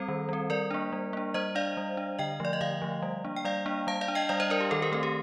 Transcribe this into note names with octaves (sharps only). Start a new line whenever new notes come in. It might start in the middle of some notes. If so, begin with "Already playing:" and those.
Already playing: G3 C4 A4 C5
D#3
G3 C4
G3 A#4 D5
A#3 D4
G3
A#3 D4
G3 C5 D#5
D4 D5 F5
G3
D4
D3 D#5 G5
F3 A3 D5
D#5
D3 D5 F5
F3 A3
G3
A#3 D4
G5
G3 D5 F5
A#3 D4
G3 F5 A5
D5 F5
D4
D#5 G5
G3 D5 F5
C5 D#5
D4 A#4 D5
G4
D#3 A4
G4 A#4
A3 C4 A4
G4